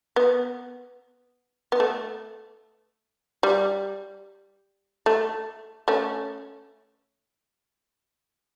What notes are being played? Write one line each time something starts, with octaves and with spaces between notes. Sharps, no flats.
B3
B3
A3
G3
A3
A3 C#4